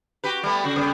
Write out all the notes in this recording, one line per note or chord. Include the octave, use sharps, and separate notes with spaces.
F#4 G4 B4
G3 A3 B3
C#3 F#4
C#3 G3 B3